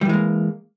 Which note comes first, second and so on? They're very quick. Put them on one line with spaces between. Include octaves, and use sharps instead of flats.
G3 E3 G#3 A#3